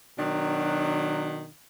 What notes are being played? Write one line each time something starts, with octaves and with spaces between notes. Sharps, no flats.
B2 D#3 F#3 D4